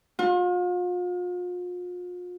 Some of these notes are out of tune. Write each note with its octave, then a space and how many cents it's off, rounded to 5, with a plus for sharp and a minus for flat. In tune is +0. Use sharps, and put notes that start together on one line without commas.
F4 +40